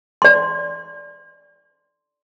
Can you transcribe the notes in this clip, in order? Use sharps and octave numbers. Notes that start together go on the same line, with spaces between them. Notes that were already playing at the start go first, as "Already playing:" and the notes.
D5 C6